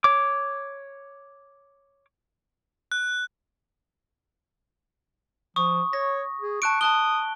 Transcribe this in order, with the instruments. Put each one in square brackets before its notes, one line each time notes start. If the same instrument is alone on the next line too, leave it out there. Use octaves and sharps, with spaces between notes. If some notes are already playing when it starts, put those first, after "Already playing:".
[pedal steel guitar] C#5 D6
[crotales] F#6
[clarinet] F3 [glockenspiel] C#6 D#6
[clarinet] C#5 [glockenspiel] A#6
[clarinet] G#4
[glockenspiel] A5 F#6 D7 [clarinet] C#6
[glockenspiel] A5 F#6 G7 [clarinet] D#6